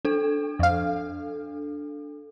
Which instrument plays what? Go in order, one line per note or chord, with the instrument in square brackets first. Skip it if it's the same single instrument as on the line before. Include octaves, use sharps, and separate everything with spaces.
[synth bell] D4 A4
[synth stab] F2 F5